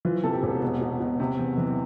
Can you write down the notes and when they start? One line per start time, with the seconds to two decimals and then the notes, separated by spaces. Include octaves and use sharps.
0.05 E3 F4
0.24 C3 A4
0.33 G4
0.43 E1
0.62 B2
0.81 B2
1.00 B2
1.20 C3
1.39 E2
1.58 E3